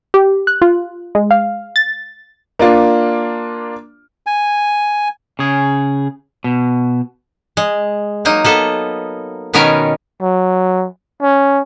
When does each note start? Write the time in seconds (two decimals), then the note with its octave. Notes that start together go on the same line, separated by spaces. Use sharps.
0.14 G4
0.47 F#6
0.62 F4
1.15 G#3
1.31 F5
1.76 A6
2.59 A#3 D4 F4
4.27 G#5
5.39 C#3 G#4
6.44 B2
7.57 G#3
8.25 F#3 A#3 D#4
8.44 A#3 B3 A4
9.53 B2 D#3 B3 C#4 A#4 G#5
10.22 F#3
11.22 C#4